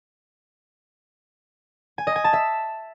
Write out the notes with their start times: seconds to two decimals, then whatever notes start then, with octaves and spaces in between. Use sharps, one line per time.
1.98 G#5
2.07 D#5
2.16 G#5
2.24 A5
2.33 E5